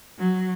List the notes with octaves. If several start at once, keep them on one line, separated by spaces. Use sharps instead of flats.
F#3